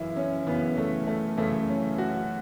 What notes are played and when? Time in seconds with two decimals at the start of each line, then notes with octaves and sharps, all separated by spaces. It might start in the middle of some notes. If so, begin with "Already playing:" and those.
Already playing: F#2 C#3 E3 E4
0.17 C#4
0.47 F#2 C#3 E3 B3
0.78 A3
1.07 A3
1.38 F#2 C#3 E3 A3
1.68 C#4
1.98 F#4